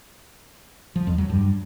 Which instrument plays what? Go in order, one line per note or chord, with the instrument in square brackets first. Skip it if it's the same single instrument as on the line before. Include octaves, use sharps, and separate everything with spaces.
[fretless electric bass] F3
F2
F#3
G2